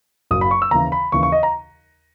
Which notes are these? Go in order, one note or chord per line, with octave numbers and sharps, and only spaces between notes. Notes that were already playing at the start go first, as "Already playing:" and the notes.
F#1 F#2 C#3 F#3 D#6
B5
C#6
E6
D#2 C#3 E3 A#5
B5
D#2 C#3 E3 C#6
C#6
D#5
A#5